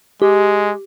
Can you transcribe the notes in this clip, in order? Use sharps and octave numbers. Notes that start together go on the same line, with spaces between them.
G#3 G4